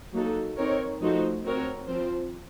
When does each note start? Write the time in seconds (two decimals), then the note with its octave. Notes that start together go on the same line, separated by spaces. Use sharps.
0.13 F#3 A#3 D#4 F#4 A4
0.57 C4 D#4 A#4 C#5
1.00 F3 A3 D#4 F#4 C5
1.44 C4 F#4 A#4 C#5
1.88 F3 C4 F4 C5